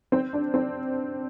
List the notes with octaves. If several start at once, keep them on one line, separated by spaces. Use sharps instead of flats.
C4
D4
C4